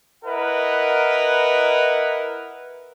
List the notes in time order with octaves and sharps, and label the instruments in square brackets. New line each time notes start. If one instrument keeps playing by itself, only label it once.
[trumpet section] E4 A#4 B4 D#5 F#5